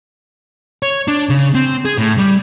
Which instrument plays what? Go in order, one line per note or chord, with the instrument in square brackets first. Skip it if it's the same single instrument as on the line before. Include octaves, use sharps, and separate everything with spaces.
[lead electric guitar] C#5
D4
C#3
C4
G#4
A2
G3